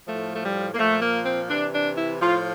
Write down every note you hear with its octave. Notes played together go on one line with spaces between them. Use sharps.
A2 F3 A3
A3
G3
A#3
A#2 F3 A3
A#3
C4
C3 E3 D4
D4
E4
A2 F3 F4